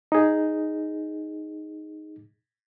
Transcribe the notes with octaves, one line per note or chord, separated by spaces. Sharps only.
D#4 G#4